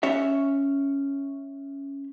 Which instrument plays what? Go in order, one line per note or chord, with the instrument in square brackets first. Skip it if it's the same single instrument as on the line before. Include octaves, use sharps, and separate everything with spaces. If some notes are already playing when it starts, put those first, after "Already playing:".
[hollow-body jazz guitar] C#4 C#5 E5